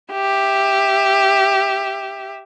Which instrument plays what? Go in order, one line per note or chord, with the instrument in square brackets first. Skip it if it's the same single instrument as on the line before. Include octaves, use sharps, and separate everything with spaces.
[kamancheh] G4 E5